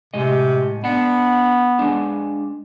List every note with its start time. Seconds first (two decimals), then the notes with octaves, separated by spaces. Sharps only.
0.14 A2 C3 G#3 D#5
0.84 B3 D4 F#5
1.79 G#3 D4